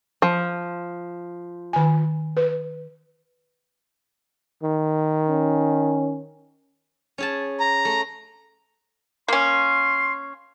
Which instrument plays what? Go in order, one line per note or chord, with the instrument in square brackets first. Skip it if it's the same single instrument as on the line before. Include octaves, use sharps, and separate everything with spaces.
[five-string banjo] F3
[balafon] D#3 G#5
B4
[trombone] D#3
[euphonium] C#4
[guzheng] C#4 G#4 A5
[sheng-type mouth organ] A#5
[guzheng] A3
[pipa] A#3 C#4 [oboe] C6